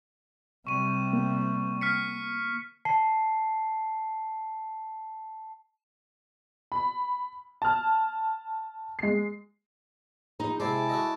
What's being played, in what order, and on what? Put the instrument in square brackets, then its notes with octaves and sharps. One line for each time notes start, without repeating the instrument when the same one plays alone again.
[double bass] C3 G3 [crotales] C#6 D#7
[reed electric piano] A#3
[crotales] F6 B6 C#7
[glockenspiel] A5 C7
[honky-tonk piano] B5
A5 F6
G#3 C7
[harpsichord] A#1 [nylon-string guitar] D#4
[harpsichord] C3 C4 D5 [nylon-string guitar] G#3 [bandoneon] E4 A5 D6
[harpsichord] F#4 A4 D#5